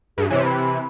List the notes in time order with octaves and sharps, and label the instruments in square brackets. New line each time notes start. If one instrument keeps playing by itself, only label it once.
[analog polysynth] G2 [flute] G#4
[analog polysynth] C3 E3 [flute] C#5
[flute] B5